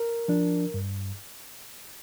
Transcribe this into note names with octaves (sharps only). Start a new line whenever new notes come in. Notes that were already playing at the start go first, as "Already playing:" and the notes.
Already playing: A#4
F3 D4
G2